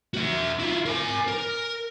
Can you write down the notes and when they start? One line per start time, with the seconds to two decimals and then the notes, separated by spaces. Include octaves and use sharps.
0.14 F#4 E5
0.59 E4 F4
0.86 A#4 G#5
1.28 A#4